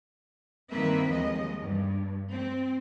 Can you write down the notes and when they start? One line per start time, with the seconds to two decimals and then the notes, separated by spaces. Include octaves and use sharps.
0.71 G2 D#3 A#3 C4 B4 E5
1.10 D#2 F3 G#3 D#5
1.61 G2
2.31 C4